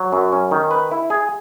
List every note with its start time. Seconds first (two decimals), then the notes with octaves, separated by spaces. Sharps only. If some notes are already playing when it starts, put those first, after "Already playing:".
Already playing: F#3
0.13 F#2
0.33 C#4
0.51 D#3
0.71 B4
0.91 E4
1.10 G#4